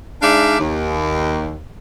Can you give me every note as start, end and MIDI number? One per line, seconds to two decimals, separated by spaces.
0.22 0.59 56
0.22 0.59 62
0.22 0.59 63
0.22 0.59 74
0.22 0.59 76
0.22 0.59 77
0.59 1.61 39